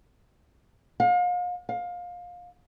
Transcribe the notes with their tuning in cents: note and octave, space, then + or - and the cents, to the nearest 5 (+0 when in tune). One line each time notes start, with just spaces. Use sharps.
F5 +40
F5 +25